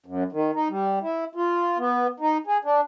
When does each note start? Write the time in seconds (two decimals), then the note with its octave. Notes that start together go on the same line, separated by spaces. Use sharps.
0.06 F#2
0.32 D#3
0.54 D#4
0.70 G3
1.02 E4
1.35 F4
1.79 B3
2.20 D#4
2.47 G#4
2.64 D4